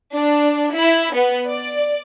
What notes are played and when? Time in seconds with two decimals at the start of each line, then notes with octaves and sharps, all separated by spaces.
0.14 D4
0.74 E4
1.15 B3
1.48 D5